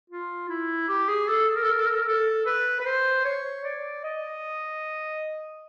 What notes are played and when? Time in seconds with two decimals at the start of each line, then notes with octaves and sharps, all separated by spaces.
0.10 F4
0.49 E4
0.88 G4
1.08 G#4
1.28 A4
1.48 A4
1.55 A#4
1.63 A4
1.70 A#4
1.78 A4
1.85 A#4
1.93 A4
2.01 A#4
2.08 A4
2.46 B4
2.80 B4
2.86 C5
3.25 C#5
3.64 D5
4.04 D#5